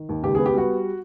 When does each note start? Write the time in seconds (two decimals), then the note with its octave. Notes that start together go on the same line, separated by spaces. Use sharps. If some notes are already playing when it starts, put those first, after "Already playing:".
Already playing: D#3
0.09 D#2
0.23 C#2 G4
0.35 G#4
0.38 B3
0.46 G4
0.54 G3 F#4